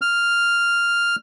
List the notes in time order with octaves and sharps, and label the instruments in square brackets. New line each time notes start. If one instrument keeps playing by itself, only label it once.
[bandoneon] F6